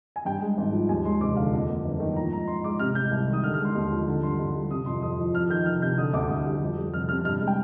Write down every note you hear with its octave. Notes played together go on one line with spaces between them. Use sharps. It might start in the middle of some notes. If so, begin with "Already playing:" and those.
G#5
G2 G5
G#3
G#1
F3
D#2 G#5
G#3 C6
F1 D6
D3 F5
F2 D#5
A#3
G1
D#3
F3 A#5
G#2 A#5
G#2 C6
G#3 D6
C3 F6
G3 G6
C2
D#3
D#6
D3 F6
F6
G#3
C6
D#2 C6
F3
D3
G2 C6
G2
G3
C3 D#6
F2 C6
F2 D#6
F3
F2 F6
D#3 G6
F1 F6
C3 G6
D3 D#6
D2 D6
D2 D#6
G3
F2
G3
F1 F6
C3 F6
G2 F6
G#3
G5